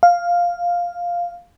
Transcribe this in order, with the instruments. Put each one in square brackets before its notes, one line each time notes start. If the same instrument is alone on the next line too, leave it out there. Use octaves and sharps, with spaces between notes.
[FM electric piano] F5